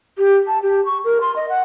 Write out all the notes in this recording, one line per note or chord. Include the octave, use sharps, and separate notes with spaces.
G4
A5
G4
C#6
A#4
C6
D#5
F#5